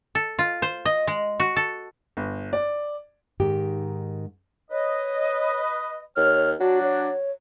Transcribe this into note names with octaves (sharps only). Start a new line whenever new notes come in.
A4
F4
C5
D#5
G#3
F#4
A4
G1
D5
G#2 D#3 G4
B4 C#5 D#5
D#2 C#5 F6
F#3 D4 F#4
C#5